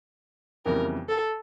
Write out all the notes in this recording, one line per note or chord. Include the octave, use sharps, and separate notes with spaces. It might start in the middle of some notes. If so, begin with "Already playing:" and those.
F2 C#3 E3 G3 B3 A#4
A4